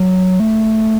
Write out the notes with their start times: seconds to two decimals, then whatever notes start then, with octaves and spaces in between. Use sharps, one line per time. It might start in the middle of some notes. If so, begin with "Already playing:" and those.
Already playing: F#3
0.40 A3